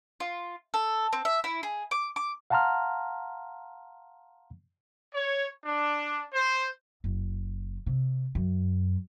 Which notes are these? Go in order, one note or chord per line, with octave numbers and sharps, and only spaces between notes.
F4
A4
C4
E5
E4
G#4
D6
D6
F5 F#5 A5 A#5 C6 F6
C#5
D4
C5
F#1
C3
F#2